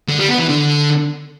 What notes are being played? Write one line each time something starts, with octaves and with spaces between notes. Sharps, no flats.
D3
G3
B3
E3
D3